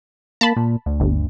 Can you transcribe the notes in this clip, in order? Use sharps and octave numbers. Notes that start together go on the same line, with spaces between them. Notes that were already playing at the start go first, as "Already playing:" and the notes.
A#3 A5 B5
A#2
D2
G1